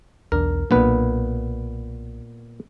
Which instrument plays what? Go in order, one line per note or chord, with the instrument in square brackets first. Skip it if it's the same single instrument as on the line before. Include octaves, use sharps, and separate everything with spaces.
[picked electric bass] B1 E2 D4 [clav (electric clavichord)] A#4
[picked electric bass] B1 A#3 D4 [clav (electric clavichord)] A#2 B3 B4